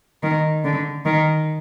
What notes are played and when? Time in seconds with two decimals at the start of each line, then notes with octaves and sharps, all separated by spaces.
0.23 D#3
0.64 D3
1.05 D#3